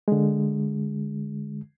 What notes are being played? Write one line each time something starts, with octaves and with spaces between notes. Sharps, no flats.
D3 G#3